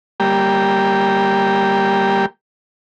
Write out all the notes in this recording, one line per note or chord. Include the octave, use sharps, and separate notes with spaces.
G3 A#3 G4